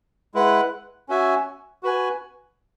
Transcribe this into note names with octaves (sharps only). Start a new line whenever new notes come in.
G#3 E4 B4 F#5
C#4 F#4 E5 G#5
F#4 B4 G#5